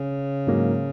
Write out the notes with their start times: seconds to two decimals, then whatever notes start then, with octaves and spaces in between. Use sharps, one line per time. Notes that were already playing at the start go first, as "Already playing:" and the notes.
Already playing: C#3
0.47 G#2 F#3 A#3